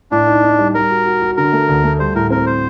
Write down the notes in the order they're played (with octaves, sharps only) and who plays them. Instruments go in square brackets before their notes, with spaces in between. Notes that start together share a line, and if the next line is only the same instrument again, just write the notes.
[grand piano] A2 [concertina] D4
[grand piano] D#4
D#4
G3
[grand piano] G3 [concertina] A#4
[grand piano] F#4
F#4
F#4
[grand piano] D3 [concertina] A#4
[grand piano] A3
D2
A3
[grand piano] G3 [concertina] C5
[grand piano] A2 [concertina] A#4
[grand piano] C4 [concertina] A#4
[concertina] C5